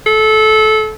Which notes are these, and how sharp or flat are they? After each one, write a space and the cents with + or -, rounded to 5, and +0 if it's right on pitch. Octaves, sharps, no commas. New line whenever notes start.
A4 -25